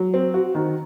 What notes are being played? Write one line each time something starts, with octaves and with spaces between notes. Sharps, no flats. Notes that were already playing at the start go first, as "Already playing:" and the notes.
Already playing: F#3
C4
F#4
D#3